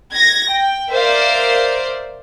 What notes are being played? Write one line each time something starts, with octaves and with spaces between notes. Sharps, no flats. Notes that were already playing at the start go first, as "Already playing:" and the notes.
G#6 A#6
G5
A#4 C5 D5 E5 F5